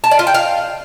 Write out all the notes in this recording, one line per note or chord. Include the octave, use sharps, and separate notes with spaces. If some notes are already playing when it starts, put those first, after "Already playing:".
A5
D5
F4
G5
F5